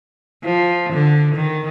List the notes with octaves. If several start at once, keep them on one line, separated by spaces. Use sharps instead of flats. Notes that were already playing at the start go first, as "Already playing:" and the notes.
F3
D3
D#3